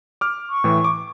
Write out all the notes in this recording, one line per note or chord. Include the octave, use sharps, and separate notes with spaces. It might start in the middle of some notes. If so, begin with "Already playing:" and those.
D6 F6
C#6
A2 E3
D6